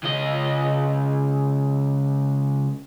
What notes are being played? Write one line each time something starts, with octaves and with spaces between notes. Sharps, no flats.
C#2 D#5